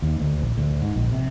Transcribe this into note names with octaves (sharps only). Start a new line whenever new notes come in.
D#2
D2
A#1
D2
G#2
A#1
C3